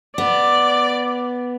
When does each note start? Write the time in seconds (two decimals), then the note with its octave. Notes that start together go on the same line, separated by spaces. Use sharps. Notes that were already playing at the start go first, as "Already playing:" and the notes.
0.18 B3 D5